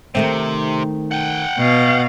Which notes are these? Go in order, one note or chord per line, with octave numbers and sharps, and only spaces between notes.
C3 D#3 A3 C4
F#5 G5
B2 F5